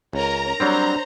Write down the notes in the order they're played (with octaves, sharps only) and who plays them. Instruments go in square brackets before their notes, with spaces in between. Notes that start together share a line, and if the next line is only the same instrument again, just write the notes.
[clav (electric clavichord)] C#2 [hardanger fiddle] C#4 A#4 [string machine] A#5
[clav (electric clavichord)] F#3 G3 C4 [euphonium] D4 [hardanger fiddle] C5 C#5